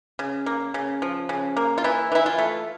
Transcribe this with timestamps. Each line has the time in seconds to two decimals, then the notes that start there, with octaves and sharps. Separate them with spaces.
0.19 C#3
0.46 A#3
0.74 C#3
1.02 F3
1.29 C#3
1.57 A#3
1.78 F4
1.84 E3 E4
2.12 E3 E4
2.26 F4
2.39 A3